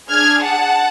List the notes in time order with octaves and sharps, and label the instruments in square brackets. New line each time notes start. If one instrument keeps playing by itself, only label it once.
[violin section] D4 G#4 F6 G#6
F#5 A5